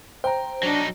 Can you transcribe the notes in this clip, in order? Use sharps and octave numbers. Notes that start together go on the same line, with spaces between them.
C5 G5 A#5
F#3 D4 D#4